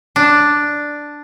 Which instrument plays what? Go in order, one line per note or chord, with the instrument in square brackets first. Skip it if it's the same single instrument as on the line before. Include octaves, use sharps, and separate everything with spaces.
[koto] D4